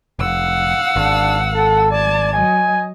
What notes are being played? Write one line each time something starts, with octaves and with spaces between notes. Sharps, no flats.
F1 F5 F#5 E6
G#1 D4
A4
D5 A5 G#6
F#3 D#5 G#5